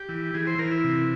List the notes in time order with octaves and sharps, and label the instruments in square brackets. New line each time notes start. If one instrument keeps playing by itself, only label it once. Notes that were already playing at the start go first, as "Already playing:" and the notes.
Already playing: [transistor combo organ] G4
E3
E3 G#4
C5
E3 A#4
E4
C3